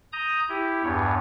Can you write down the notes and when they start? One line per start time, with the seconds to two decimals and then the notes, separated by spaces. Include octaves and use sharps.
0.13 A#5 D#6 G6
0.49 E4 G4
0.83 E2 G2 C#5